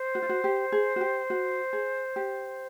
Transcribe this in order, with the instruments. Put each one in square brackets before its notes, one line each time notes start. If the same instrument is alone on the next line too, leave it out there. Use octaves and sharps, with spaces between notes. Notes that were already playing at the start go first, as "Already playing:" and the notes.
Already playing: [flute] C5
[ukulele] F#4
F4
F#4
G4
G#4
F#4
G4
F#4
G#4
G4